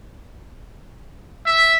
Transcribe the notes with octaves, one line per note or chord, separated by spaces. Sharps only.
E5